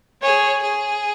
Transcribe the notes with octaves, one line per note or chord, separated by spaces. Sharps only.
G#4 C#5
G#4